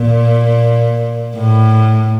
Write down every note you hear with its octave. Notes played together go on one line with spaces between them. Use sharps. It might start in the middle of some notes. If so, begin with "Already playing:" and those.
Already playing: A#2
A2